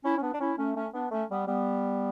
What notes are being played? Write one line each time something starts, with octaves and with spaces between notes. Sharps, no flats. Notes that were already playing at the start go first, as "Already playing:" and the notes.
C#4 E4
C#4
B3 D4
D4
C#4 E4
A3 C#4
A3 C#4
B3 D4
A3 C#4
G3 B3
G3 B3